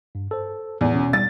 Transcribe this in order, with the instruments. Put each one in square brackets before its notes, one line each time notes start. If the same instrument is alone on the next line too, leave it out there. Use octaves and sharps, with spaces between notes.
[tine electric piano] G2
A4 C5
[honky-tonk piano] E2 [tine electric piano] A2
[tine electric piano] B2 C#4
[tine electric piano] G3 [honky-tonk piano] A6